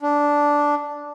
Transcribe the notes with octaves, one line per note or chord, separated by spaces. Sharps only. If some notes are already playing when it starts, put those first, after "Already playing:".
D4